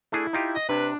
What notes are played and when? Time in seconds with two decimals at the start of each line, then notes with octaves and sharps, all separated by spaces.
0.12 A3 D4 E4 G#4
0.33 D#4 F4 G4
0.55 D#5
0.69 C3 D4 B4